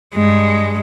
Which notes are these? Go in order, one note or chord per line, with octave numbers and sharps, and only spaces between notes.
G2 G#3